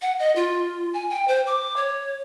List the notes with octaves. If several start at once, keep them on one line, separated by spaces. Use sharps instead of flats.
F#5
D#5
F4
G#5
G5
C5
D6
C#5